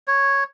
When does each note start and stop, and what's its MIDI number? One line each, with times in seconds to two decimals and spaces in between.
0.07 0.44 73